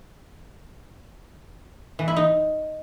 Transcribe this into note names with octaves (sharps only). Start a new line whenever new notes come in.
E3
E4
D#4